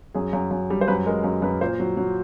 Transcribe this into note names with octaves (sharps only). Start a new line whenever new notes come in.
F#2 G#4
F#2
F#2
G3
C5
F#2 B4
G#3 A#4
F#2
F#2 B4
A#2 C5
F#3
F#3